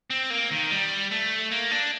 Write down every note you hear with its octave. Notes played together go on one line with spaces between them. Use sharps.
C4
A#3
D#3
G3
A3
A#3
D4